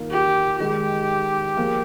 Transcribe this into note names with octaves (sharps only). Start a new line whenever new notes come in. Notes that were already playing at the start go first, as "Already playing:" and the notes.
Already playing: D#3 A#3 F4
G4
D#3 G#3 D#4 G4
F3 A#3 F4 G#4